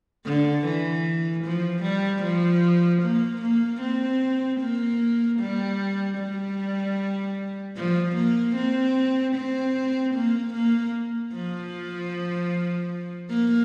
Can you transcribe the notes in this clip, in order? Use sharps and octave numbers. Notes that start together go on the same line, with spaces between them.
D3
E3
F3
G3
F3
A#3
A#3
C4
A#3
G3
G3
F3
A#3
C4
C4
A#3
A#3
F3
A#3